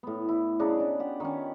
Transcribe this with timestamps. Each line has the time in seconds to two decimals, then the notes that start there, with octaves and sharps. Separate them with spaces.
0.03 A2 B3
0.29 E4
0.59 C#3 D4 D#4 G#4
0.80 D4
0.99 F4 G4 F#5
1.20 D#3 C#4